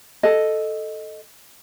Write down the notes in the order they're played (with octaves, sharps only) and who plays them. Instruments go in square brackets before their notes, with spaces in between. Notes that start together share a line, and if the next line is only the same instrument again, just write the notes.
[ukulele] A4 D#5